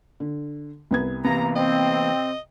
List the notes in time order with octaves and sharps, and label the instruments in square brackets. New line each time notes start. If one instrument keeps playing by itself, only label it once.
[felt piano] D3
C2 B3 G#6
[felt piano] C3 [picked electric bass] E3 A#3 B3 [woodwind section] A#5
[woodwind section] C4 [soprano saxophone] D#5